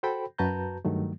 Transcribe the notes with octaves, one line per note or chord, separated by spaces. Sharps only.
F#4 A4 C5 G5 B5
F#2 F#4 B4 A5 A#5 G6
G2 D#3 F#3 A3